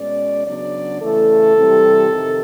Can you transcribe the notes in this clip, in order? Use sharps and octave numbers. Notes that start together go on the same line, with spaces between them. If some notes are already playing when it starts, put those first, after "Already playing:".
Already playing: B2 G#3 C#4 D5
C#3 F#3 B3 D4 D5
C#3 E3 A3 A4
C3 E3 G3
F2 C3 D#3